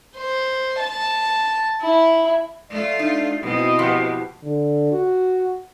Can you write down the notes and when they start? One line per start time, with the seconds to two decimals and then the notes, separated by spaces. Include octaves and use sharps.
0.16 C5
0.79 A5
1.82 E4
2.70 A3 F4 D5
2.99 D4 D#4
3.41 B2 C4 E4 F#4 D#5
3.79 F3 G4 F#5
4.43 D3
4.92 F#4